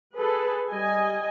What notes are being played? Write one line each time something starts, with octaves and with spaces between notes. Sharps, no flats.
G#4 A4 B4
G3 D#5 G#5